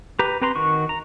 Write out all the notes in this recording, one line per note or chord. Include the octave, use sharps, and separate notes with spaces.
G4 B4 A#5
C4 B4 A#5 C6
D#3 F#4 C#6
A#5